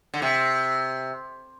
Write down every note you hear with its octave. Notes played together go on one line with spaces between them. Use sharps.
D3
C3